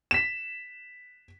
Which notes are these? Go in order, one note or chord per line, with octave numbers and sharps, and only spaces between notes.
B6 E7